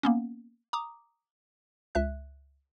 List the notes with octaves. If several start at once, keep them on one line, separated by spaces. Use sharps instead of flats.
A#3 B3 C#4
A#5 D6 D#6
C#2 E5 F#6